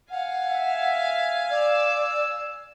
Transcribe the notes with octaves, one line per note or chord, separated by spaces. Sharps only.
F5 F#5 G#5
E5
D5 E6